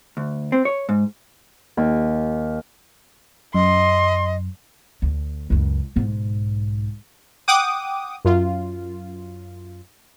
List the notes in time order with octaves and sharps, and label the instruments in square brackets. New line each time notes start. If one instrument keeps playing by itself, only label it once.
[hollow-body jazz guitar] D2
C4
C#5
G#2
[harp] D#2
[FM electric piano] F#2 [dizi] D#5 [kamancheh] C6
[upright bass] D2
C#2 F#2
B1 G#2
[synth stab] F#5 G5 D6 D#6
F#2 F4